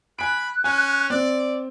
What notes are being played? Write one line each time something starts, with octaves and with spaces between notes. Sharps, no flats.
G#5 B5 F#6 D7
C#4 G#5
C4 D5